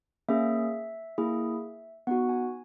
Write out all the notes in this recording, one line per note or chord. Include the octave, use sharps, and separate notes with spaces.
A#3 C#4 G#4 E5
A#3 E4 G#4
B3 D#4 F#4 F#5
G#5